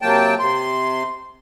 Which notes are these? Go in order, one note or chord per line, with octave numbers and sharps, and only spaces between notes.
C3 F#3 A#3 G5 A5
C3 C6